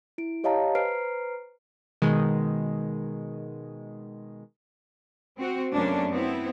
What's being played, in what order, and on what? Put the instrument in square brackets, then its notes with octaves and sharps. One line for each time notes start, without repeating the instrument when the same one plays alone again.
[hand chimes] E4 D7
G4 C#5 D#5 F5 A5 A#5
B4 C5 A#5 F6 C7 D7
[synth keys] B2 D#3 G#3
[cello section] C4 F#4
F#2 C3 A3 A#3 C#4 D4
B3 C4 E4